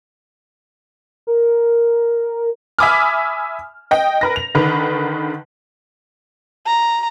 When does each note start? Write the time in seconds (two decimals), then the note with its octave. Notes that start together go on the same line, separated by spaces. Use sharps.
1.27 A#4
2.79 E5 G#5 B5 D6 D#6 F6
3.91 D#5 G5
4.21 A#4 B4 A#6
4.36 F7
4.55 D3 D#3 A#4 B4
6.66 A#5